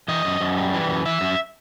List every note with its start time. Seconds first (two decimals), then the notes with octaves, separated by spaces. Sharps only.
0.08 E3 D#5
0.25 F#2
0.41 F#2
0.57 G3
0.74 E3
0.89 F#2
1.05 E3 E5
1.21 F#2